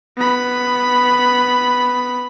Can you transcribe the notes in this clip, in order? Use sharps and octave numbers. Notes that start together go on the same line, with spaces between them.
B3 B5